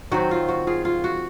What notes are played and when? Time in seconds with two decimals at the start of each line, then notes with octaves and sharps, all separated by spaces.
0.11 D#3 F#3 C4 F#4
0.31 F4
0.49 F#4
0.67 F4 G#4
0.85 F4
1.04 F#4